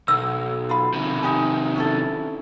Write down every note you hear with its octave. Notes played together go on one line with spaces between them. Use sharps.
B1 E6
F4 F5 B5
C3 D#3
D#4 G4 G#5
C#4 E4 A4